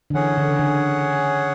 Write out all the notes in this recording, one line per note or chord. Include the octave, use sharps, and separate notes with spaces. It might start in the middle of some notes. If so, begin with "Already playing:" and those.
D3
E3 C#4 G#4 C#5 F#5
D3
C#3
D3